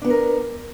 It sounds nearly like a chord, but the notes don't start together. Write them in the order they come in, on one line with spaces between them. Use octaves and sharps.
D4 B3 B4 A#4